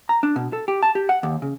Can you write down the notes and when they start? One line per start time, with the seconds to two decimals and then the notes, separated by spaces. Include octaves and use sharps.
0.09 A#5
0.23 D4
0.36 B2
0.53 A4
0.68 G4
0.83 A5
0.95 G4
1.09 F#5
1.23 D#2
1.42 C#3